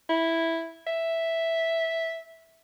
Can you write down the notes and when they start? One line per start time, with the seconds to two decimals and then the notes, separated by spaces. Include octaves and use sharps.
0.09 E4
0.87 E5